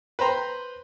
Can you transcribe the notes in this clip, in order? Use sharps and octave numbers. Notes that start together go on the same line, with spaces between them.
B4 C5 G5 A#5 C6